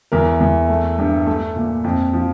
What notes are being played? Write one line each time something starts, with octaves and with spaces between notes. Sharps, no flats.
E2 A#4
E2
A3
G2
A3
A#2
F2
F3